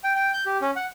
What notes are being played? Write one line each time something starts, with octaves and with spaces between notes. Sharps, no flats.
G5
G5
G6
G4
C#4
F#5